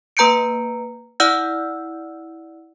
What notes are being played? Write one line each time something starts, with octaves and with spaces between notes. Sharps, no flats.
A#3 B4 A#5 G6 C#7 D7
E4 D5 F#5 E6 F6 G6